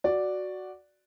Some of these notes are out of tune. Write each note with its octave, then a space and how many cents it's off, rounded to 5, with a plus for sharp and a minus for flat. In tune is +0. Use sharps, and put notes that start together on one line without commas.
F#4 +0 D5 +0